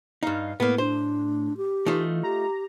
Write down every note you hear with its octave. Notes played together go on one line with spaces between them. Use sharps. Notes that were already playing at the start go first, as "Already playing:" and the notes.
G2 D#4 F5
A2 A#3 B3
D4 C5
G4
E3 A3 D#4 F4
G4 A#5